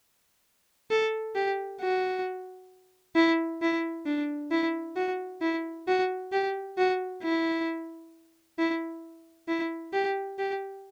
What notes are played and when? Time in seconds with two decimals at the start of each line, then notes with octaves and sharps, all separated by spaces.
0.90 A4
1.35 G4
1.81 F#4
3.16 E4
3.62 E4
4.06 D4
4.51 E4
4.96 F#4
5.41 E4
5.88 F#4
6.32 G4
6.77 F#4
7.23 E4
8.58 E4
9.48 E4
9.93 G4
10.39 G4